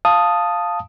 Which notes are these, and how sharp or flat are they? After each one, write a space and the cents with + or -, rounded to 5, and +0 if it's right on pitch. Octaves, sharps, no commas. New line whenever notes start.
F5 +0 A5 +0 D#6 +0